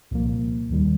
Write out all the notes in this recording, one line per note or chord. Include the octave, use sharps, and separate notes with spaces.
C2 A#2 F3 A#3
D#2 D#3 G3